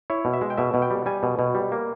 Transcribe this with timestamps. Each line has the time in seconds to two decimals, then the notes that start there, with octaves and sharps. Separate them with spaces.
0.10 E4 C#5
0.25 B2
0.33 E5
0.41 G#3
0.50 G5
0.57 B2 E5
0.74 B2
0.82 G5
0.91 G3
1.06 G3 G#5
1.23 B2
1.39 B2
1.55 G3
1.72 A#3